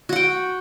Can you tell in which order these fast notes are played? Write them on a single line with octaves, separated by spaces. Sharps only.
F#4 F#5 G5